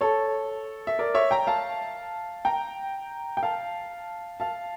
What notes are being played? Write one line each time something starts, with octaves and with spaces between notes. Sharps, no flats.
A4 C#5
E5
A#4 D5
C#5 E5
G5 A#5
F5 A5
G5 A#5
G5
F5 A5
F5 A5